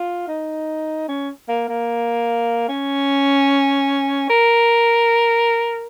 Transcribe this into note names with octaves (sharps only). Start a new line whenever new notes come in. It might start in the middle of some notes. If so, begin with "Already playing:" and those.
Already playing: F4
D#4
C#4
A#3
A#3
C#4
A#4